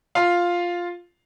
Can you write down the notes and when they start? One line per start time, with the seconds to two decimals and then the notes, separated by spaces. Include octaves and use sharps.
0.15 F4 F5